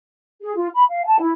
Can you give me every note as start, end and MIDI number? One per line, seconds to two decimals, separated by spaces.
0.41 0.51 68
0.56 0.67 65
0.74 0.83 83
0.89 1.04 77
1.05 1.18 81
1.19 1.31 64